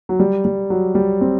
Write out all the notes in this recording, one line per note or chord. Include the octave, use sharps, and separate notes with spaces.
F#3
G3
G3
F#3
G3
C4